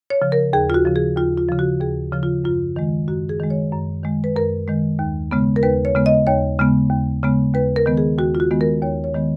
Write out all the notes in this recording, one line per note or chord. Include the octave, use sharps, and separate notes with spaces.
C#5
C#3 F3
A#4
D#2 G#4
F4
F#4
C#3 F3
G#4
D#2 F4
F4
C#3 F3
F#4
D#2 G#4
C#3 F3
F4
F#2 F4
D#3 G#3
F#2 F#4
G#4
D#3 G#3
C#5
F#2
D#3 G#3
B4
F#2 A#4
D#3 G#3
D#2
C#3 G#3 B3
A#4
D#2 B4
C#5
C#3 G#3 B3
D#5
D#2 C#5
C#3 G#3 B3
D#2
C#3 G#3 B3
D#2 B4
A#4
D#3 G#3 B3
G#4
D#2 F#4
F4
F#4
D#3 G#3 B3
A#4
D#2 C#5
C#5
D#3 G#3 B3